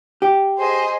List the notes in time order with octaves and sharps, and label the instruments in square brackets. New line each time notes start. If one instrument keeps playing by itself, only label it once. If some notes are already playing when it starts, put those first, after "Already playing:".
[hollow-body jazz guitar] G4
[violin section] G#4 C5 D#5